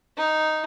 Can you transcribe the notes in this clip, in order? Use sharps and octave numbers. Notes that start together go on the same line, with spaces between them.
D#4